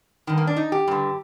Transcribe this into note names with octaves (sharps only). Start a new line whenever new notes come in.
G2 D#3
A#3
D4
D#4
G4
G2 D3